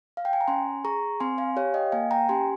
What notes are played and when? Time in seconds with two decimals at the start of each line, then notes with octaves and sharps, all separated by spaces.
0.17 F5
0.25 G5
0.33 G#5
0.41 A#5
0.48 C#4 G#5 C6
0.85 G#4 A#5 C#6
1.20 C4 G#5 C6
1.38 F5 G#5
1.56 G4 C#5 F5
1.74 D#5 G5
1.92 A#3 F5 G#5
2.11 G5 A#5
2.29 C#4 G4 G#5 C6